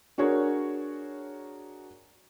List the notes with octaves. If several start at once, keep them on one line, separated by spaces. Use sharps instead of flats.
D4 F#4 G#4 A#4 C#5